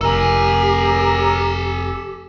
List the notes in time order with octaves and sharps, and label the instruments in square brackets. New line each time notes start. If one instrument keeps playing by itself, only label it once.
[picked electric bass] F1 [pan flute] G4 [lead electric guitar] A4 G#5 [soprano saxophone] A#4